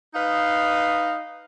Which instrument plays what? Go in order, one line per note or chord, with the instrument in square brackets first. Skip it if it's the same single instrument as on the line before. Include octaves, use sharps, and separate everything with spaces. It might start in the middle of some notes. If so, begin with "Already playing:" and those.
[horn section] D#4 B4 D#5 F5